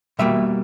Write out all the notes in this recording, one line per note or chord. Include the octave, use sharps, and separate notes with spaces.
B2 G3 A#3 E5